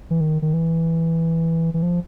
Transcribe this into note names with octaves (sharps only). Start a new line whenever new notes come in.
E3
D#3
D#3
E3
E3
F3